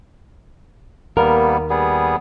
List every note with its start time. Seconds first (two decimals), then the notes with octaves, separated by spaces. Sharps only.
1.17 D#2 G3 A#3 B3 A#4
1.70 G3 B3 G#4